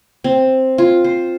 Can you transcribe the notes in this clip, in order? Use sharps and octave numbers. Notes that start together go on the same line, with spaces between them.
C4
F4
C5